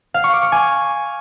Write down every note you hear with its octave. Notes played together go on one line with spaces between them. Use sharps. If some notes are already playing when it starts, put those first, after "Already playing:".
F5
C#6
D6
C#6
G#5